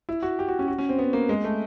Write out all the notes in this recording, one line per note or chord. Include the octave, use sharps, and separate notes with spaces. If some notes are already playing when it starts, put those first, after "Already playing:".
E4
F#4
G4
F#4
C#4
F#4
C#4
C4
B3
A#3
G#3
A3